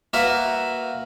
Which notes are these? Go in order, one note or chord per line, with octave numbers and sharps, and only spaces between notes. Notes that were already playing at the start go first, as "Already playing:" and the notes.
A#3 F#4 A#4 B4 E5